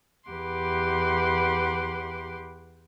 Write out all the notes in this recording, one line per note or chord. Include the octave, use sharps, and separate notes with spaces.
E2 G4 B4 F#5 C6 D6